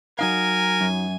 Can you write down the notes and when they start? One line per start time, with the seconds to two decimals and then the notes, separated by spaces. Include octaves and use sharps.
0.19 F#3 D#4 A#4 F5 G#5
0.81 F#2